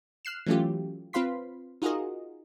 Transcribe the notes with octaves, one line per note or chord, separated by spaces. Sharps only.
F6 F#6 C7 E7
E3 F#3 A3 C#4 F4 G4
C4 F4 B4 F5 C6 B6
D#4 F4 F#4 G#4 A#4 D#5